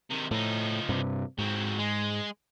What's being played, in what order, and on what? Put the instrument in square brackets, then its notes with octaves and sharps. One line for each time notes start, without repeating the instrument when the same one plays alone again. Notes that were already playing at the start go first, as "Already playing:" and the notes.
[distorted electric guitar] C3 D#3
[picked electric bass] A2 [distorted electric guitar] F3 D#4
[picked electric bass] G2 C3
[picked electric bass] G#2 [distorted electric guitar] F#3 C4
[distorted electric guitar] G#3